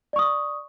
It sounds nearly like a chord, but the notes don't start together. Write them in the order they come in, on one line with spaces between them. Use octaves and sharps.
D5 C#6 D#6